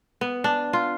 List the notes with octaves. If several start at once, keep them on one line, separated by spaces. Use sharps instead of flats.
B3
D4
F4